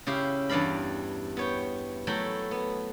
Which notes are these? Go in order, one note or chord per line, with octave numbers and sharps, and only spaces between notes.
C#3 E4 G4 F5
E2 G2 D5 F5 B5
B3 C#5 G5
F#3 A3 E4 G5 B5
B3